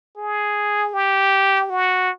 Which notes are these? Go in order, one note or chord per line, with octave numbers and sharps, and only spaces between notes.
G#4
G4
F#4